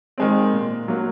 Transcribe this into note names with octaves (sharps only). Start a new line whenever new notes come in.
D#3 G#3 C4
A#2
F#3 A#3